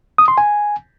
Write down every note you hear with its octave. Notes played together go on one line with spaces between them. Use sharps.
D#6
C6
G#5